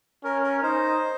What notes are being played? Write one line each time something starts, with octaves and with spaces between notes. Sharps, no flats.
C#4 A#4
A#4
D#4 C5